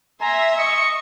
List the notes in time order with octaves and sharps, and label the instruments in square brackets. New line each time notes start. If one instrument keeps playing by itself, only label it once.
[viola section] E5 [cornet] G#5 [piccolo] A#5 [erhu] C6
[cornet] D#5 [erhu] C#6 [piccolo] C#7